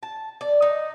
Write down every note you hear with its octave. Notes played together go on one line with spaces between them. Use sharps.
A5
D5
D#4